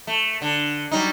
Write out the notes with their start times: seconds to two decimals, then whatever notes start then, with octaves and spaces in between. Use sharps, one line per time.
0.07 A3
0.42 D3
0.91 F#3 G3 D#4